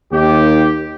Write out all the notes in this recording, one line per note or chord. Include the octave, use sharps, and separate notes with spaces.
D#2 G4